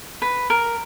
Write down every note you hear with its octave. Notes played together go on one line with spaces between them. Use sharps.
B4
A#4